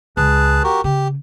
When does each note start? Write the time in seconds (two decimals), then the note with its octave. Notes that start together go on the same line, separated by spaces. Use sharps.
0.17 C#2 G#4 B4 A5
0.64 F#4 G4 A#4
0.84 C#3 G4